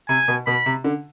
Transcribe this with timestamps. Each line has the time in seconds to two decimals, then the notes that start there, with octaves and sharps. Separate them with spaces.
0.09 C3 G#5
0.28 B2
0.47 B2 B5
0.66 C3
0.84 D3